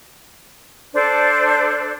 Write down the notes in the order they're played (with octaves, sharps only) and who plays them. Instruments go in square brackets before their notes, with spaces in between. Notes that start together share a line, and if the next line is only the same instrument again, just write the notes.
[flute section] D4 A4 C5 D5